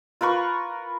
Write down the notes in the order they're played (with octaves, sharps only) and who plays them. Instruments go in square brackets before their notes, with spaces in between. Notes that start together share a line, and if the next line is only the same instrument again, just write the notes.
[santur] F4 A#4 B4 C#6